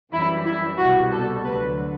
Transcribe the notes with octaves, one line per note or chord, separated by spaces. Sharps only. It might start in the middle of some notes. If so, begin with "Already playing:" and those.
F#2 E3 G3 E4
E4
C2 B2 G3 F#4
A4
D2 D3 F#3 B4